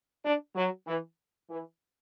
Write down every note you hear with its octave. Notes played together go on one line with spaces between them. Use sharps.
D4
F#3
E3
E3